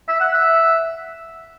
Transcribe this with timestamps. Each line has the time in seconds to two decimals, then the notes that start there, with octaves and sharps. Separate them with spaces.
0.08 E5
0.20 F#5
0.34 E5